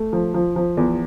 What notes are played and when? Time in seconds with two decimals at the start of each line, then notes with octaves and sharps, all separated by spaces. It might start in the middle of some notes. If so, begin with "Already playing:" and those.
Already playing: A3
0.13 F3
0.34 F3
0.56 F3
0.77 E2